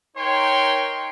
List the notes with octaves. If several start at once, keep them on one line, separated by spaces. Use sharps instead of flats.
D#4 A#4 C#5 G5 C6